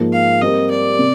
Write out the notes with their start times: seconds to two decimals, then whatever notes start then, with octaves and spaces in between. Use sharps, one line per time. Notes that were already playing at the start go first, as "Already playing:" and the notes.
Already playing: G#2 F3 A#3
0.13 F5
0.41 G3 C4 G4 A#4 D#5
0.70 D5
0.99 C3